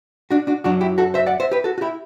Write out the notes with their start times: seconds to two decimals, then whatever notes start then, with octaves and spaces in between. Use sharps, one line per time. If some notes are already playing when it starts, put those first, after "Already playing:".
0.31 D4 F#4
0.47 D4 F#4
0.64 F#2 F#3 D4 F#4
0.81 E4 G4
0.98 F#4 A4
1.14 C5 E5
1.26 D5 F#5
1.40 C5 E5
1.52 G4 B4
1.64 F#4 A4
1.78 F#4
1.81 E4 G4